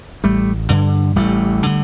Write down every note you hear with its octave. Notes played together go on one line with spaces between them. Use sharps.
A1 G3 A3
G2 D3
A1 G3 A3
D3